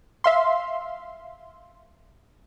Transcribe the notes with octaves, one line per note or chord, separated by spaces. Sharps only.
E5 F5 C6